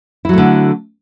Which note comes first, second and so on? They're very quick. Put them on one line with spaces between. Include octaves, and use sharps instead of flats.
E4 F#3 A3 D3